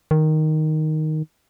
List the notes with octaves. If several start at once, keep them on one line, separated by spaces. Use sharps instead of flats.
D#3